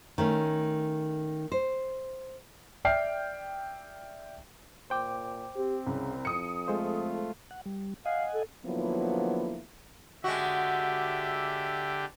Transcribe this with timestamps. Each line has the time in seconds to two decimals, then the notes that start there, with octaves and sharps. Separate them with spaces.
0.18 D#3 A3 C#4
1.52 C5
2.85 D5 E5 G5 F6 C7
4.90 A#2 C5 G5 D6
5.56 C4 G4
5.87 C2 C#3
6.25 F2 D#6 C#7
6.68 G#3 A3 F4 C5
7.51 F#5
7.66 G3
8.06 D#5 F5 F#5 G#5
8.34 A4
8.66 D3 F3 F#3 A#3 B3 E4
10.24 D3 G#3 F#4 G4 E5